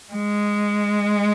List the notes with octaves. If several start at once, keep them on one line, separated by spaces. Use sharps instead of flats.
G#3